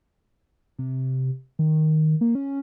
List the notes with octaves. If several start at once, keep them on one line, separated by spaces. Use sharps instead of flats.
C3
D#3
A#3
C#4